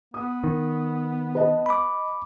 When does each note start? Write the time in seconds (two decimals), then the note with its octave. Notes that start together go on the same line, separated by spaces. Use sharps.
0.14 B3 D#6
0.44 D#3
1.35 B4 D#5 A5
1.66 B5 D6